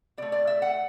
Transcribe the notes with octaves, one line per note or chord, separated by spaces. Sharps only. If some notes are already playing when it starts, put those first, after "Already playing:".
B2 A3 D5
D5
E5
F#5